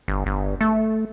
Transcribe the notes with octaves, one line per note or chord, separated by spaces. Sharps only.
G1
G1
A3